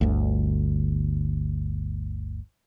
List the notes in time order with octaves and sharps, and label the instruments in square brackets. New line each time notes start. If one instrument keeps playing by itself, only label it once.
[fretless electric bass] G1 D2